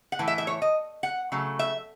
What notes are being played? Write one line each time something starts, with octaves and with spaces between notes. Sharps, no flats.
F#5
A2 E3
E5
E5
C#5
D#5
F#5
C#3 F#3 A3
E5